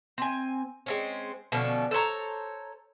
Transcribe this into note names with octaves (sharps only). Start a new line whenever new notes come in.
C4 G#5
G#3 C4 C#4
B2 D3 F3 C#4
A4 C5 C#5 A#5